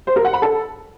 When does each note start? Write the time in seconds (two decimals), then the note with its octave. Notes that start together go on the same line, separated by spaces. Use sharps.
0.07 C5
0.16 A#4
0.25 F#5
0.33 B5
0.42 A4